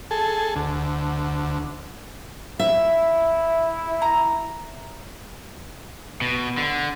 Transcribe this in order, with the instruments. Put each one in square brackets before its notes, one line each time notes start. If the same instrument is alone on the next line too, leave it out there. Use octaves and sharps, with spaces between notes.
[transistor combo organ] G#4 A4
D2
[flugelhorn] E4 [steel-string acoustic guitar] E5
[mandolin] A#5
[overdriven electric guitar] B2
D3